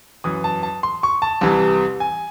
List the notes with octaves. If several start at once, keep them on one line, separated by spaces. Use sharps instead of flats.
F#2 E3 D#6
A5
A5
C6
C#6
A5
C2 C3 E3
G#5